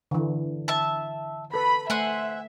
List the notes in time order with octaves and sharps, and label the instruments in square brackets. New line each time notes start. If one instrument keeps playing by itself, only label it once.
[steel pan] D3 E3
[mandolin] E5 A5
[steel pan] A4 B4 [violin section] B5
[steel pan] A3 [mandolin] C5 F#5 G#5 [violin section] E5